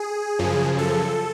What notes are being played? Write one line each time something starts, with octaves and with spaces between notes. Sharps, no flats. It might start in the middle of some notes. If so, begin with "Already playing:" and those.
Already playing: G#4
F#2 C#3 F3
A4